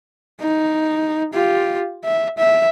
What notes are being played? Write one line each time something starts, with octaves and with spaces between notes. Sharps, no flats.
D#4
F4 G4
E5
E5